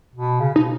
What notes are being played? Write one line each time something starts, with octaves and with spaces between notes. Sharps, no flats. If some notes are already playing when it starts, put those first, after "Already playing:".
B2
C#3
B2 D#4